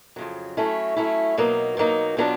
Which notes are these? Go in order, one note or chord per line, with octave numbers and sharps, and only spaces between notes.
F2 C#3 F#3
F#3 A3 C#4 E4
F#3 A3 C#4 E4
B2 F#3 A#3 D#4
B2 F#3 A#3 D#4
B2 F#3 B3 D4 F4